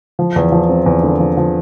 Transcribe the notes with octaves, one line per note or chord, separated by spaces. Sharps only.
F3
E2
F3
C4
E2
D3
F3
F3